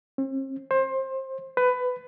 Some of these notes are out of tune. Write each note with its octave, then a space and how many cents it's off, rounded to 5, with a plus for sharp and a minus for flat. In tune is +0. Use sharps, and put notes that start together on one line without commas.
C4 +45
C5 +25
B4 +20